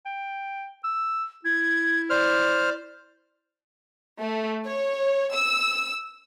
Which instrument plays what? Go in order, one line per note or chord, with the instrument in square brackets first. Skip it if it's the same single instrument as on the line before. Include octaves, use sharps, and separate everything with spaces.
[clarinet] G5
E6
[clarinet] E4 [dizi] G#6
[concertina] C5 F6 [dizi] D5
[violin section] A3
C#5
E6